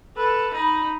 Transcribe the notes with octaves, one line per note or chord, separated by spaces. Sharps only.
A4 B4
D#4 B5